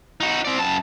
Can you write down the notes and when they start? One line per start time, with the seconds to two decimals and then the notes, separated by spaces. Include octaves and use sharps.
0.20 D#4 F#4
0.45 C4 D5
0.59 F#2 A5